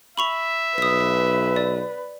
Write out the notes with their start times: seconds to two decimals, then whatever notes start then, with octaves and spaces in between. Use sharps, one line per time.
0.17 E5 B5 C#6 F7
0.78 B1 B4 D#6 B6
1.56 D5